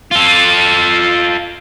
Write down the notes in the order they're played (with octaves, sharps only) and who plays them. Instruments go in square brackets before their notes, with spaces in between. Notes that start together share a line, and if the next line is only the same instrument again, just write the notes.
[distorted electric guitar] F4 A4